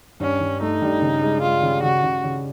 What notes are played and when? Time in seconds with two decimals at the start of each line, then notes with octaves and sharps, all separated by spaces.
0.20 G2 C#4
0.41 G2
0.61 A3 D#4
0.82 G2
1.02 C#3
1.22 G#3
1.42 G#3 F4
1.63 C#3
1.83 C#3 F#4
2.03 C#3
2.24 C#3